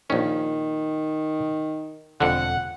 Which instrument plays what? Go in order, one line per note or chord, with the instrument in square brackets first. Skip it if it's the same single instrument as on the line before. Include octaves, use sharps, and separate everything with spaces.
[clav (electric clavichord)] A#1 C#4 [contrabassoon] D#3
[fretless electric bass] E1 [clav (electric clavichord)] F2 D3 [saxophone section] F#5